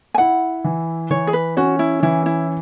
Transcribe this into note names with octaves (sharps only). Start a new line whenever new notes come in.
G#5
E4 F#5
E3
E3 C#5
G#4
B4
C#4 F#4
E4
E3 E4
E4